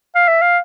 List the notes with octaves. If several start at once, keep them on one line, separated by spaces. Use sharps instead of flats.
F5
E5
F5